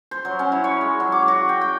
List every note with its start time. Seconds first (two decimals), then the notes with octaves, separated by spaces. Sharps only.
0.11 C5
0.25 F#3
0.39 C#4
0.52 E4
0.64 C#5
0.81 G#3
1.00 F#3
1.12 D6
1.28 F#4
1.49 G5
1.61 G5